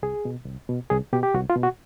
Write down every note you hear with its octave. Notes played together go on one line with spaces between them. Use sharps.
C2 G#4
B2
C2
B2
C2 G#4
B2 G4
G4
C2 F#4
F4
B2
F#4